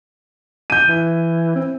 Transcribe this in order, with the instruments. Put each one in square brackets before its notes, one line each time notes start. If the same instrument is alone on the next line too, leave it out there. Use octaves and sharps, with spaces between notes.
[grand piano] G6 D#7
[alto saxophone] E3
C4